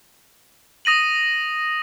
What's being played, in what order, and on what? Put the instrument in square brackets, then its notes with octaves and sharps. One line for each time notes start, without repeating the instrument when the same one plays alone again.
[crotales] D#6 A#6 D#7 F#7